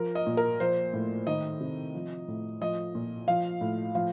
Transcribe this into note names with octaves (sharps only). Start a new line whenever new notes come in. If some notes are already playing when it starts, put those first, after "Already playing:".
Already playing: F3 A#4
D#5
A#2
A#4
F3 C5
A2
D#3 D#5
C3
F3
A2
F3 D#5
A#2
F3 F5
A2
F3 F5